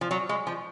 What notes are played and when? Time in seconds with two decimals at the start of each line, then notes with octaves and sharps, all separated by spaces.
0.01 F3
0.11 F#3
0.29 G#3
0.47 F3